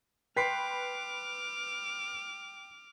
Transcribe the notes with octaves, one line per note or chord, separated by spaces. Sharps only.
B4 G5 B5 C6 D6 F6 B6 C7